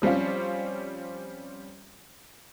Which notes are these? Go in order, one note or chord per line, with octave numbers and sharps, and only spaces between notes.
F3 G3 C4 C#4 F4